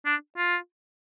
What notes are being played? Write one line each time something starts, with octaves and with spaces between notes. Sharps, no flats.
D4
F4